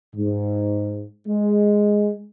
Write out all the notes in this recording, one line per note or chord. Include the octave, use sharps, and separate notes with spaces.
G#2
G#3